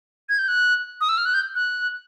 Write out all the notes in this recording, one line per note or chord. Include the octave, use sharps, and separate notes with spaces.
G#6
G6
F#6
D#6
E6
F6
F#6
G6
F#6